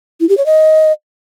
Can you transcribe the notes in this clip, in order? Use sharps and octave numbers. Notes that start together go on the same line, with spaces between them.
E4
G4
C#5
D#5